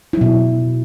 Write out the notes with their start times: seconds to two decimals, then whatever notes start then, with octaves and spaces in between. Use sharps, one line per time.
0.13 E4
0.17 F#3
0.21 B2